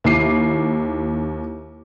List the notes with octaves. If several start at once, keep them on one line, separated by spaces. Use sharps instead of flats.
D#2 E4 D6 C7 D#7